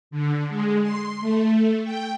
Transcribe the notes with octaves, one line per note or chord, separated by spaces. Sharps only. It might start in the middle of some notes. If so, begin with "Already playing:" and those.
D3
G#3
C6
A3
G5